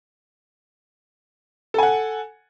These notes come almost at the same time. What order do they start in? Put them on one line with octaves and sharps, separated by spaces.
A4 G#5 F#5